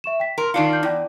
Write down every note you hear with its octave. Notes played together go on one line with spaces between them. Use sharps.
E5 C#6 E7
G5 B6
A#4 A#5 C6
D#3 D4 D#4 F4 C7 C#7
F6 G6
E2 E4 D5 G5